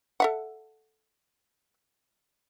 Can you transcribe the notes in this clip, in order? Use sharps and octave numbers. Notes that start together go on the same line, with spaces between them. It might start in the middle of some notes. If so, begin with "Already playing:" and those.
A4 E5 F#5